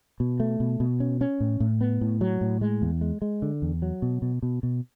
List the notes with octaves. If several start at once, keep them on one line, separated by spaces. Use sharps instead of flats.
B2
A3
B2
B2
C#4
C#4
A2
A2
B3
A2
F#3
A2
G#3
E2
G#3
G#3
D3
E2
F#3
B2
B2
B2
B2